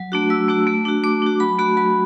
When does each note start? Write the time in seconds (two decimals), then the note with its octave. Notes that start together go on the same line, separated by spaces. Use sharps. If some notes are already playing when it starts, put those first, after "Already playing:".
Already playing: F#3
0.12 A3 D4 F#4
0.30 F#3 E6
0.48 A3 D4 F#4
0.67 A3
0.85 D4 F#4
1.04 A3 D6
1.22 D4 F#4
1.40 F#3 B5
1.59 A3 F#4 B5
1.77 F#3 B5